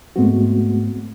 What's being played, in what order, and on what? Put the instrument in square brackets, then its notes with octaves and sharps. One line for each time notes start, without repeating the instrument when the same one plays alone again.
[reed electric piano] G#2 G#3 A3 B3 C4 F#4